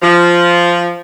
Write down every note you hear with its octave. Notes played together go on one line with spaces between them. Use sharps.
F3